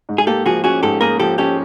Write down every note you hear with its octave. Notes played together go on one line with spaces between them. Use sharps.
G#2
G#4
A#3 G4 A4
F3 F#4 G#4
C#4 F#4 G#4
G#2 G4 A4
A#3 G#4 A#4
F3 G4 A4
C#4 G4 A4